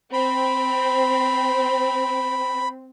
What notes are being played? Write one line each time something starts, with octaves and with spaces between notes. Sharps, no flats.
C4 B5